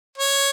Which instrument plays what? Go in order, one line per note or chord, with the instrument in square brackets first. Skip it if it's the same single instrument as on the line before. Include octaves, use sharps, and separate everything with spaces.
[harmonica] C#5